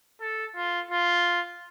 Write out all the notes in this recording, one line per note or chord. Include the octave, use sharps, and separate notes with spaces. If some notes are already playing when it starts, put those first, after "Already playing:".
A4
F4
F4